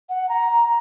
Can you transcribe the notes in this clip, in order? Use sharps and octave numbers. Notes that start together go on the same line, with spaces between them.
F#5
A#5